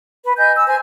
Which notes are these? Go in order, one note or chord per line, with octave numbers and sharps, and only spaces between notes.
B4
D#5 G#5 G6
E6
C5 G#5